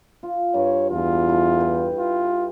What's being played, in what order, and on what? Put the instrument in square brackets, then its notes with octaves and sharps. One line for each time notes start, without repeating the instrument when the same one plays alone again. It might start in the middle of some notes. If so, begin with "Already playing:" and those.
[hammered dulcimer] F4
[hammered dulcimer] G2 [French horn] C#5
[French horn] E2 [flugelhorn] F4
[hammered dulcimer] E4 A4
G4 B4
[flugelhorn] F4